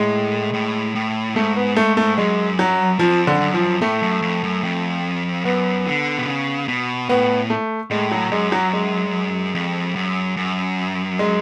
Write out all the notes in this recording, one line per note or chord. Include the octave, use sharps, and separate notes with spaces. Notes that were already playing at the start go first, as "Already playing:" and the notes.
Already playing: A2 G#3
A2
A2
G#2 A3
B3
A3
A3
F#2 G#3
F#3
F2 F3
D3
F#2
F3
A2 A3
F#2
F2
F#2
F2
F#2 B3
D3
B2
C#3
B2
A2 B3
A3
A2 G#3
F#3
F#2 G#3
F#3
G#3
F2
F#2
F#2
G#3